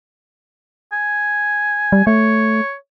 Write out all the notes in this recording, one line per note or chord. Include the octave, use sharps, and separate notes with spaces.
G#5
G3
A3 C#5